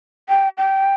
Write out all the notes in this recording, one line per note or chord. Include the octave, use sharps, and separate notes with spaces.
G5
G5